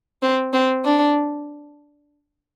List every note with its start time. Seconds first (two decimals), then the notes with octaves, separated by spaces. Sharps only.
0.22 C4
0.53 C4
0.85 D4